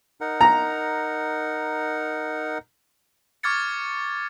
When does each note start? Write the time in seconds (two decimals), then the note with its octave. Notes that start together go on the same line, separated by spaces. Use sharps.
0.21 D#4 A#4 F#5
0.41 A#5
3.43 C#6 D6 F6 G#6 A6 C#7